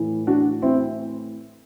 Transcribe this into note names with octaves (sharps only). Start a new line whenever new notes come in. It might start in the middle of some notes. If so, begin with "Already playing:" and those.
Already playing: A2 E3
D4 F#4
C4 E4